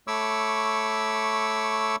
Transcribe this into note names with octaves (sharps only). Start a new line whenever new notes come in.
A3 C#5 B5 C#6 D6 E6